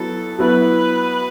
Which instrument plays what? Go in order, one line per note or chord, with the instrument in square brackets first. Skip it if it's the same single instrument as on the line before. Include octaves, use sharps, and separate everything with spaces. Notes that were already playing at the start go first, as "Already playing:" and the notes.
Already playing: [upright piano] F#3 B3 E4 [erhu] A4
[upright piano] F#3 B3 E4 [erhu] B4